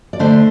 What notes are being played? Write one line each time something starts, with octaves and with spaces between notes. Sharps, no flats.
D5
D3 A3 D4 C5